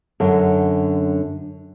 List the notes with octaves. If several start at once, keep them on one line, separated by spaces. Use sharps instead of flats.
F#2 D3